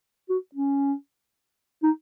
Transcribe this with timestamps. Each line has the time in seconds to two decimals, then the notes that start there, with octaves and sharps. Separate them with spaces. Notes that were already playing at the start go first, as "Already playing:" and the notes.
0.29 F#4
0.55 C#4
1.83 D#4